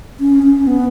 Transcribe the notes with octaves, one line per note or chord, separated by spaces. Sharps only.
C#4
C#4
B3